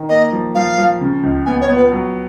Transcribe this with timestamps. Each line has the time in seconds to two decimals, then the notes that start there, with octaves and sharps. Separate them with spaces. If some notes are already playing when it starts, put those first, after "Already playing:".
Already playing: D#3
0.09 A#3 D#5
0.32 F3
0.55 F3 F5
0.78 F3
1.01 C#3
1.23 C#2
1.46 B3 G#5
1.61 C#5
1.69 B3
1.77 B4
1.92 F#3